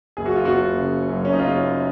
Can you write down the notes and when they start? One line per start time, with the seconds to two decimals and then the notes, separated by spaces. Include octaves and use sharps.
0.17 F#1 G#4
0.26 F#4
0.36 F4
0.45 F#1 F#4
0.78 C#3
1.09 F#2
1.25 C#4
1.33 D#4
1.39 F#1 F4